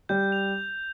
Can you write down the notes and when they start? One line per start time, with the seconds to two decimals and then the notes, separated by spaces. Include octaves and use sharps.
0.09 G3 G6
0.32 F7